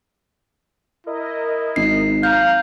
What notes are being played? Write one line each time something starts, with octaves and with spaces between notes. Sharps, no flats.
E4 A#4 D#5
G#1 C7
F5 A#5 G6